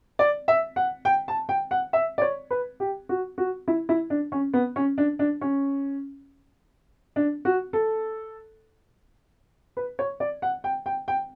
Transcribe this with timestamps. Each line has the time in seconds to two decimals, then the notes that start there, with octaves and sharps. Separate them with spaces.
0.19 D5
0.48 E5
0.76 F#5
1.05 G5
1.28 A5
1.49 G5
1.71 F#5
1.93 E5
2.18 D5
2.22 C#5
2.51 B4
2.80 G4
3.09 F#4
3.38 F#4
3.68 E4
3.89 E4
4.10 D4
4.32 C#4
4.54 B3
4.76 C#4
4.98 D4
5.19 D4
5.41 C#4
7.16 D4
7.45 F#4
7.73 A4
9.77 B4
9.99 C#5
10.20 D5
10.42 F#5
10.64 G5
10.86 G5
11.08 G5